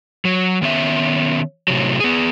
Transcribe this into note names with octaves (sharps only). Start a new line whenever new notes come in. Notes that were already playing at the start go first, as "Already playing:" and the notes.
F#3
D#3 B3 C#4 E5
A2 C3 F#3
B3 G#4